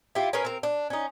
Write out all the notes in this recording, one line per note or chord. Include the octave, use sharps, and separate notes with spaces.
E4 F4 G4
C#4 G#4 A#4 B4
C4 A#4
D4
C#4 D#4